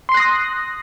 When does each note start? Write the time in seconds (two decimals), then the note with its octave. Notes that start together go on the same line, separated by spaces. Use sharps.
0.09 C6
0.12 C7
0.14 F#6
0.17 A#6
0.20 D#6